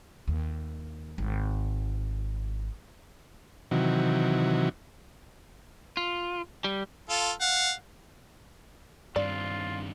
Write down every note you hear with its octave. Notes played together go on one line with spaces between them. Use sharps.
D#2
G#1
C3 D#3 E3 F#3
F4
G3
F4 A4
F5 F#5
G2 D#3 C4 D4 F4 D5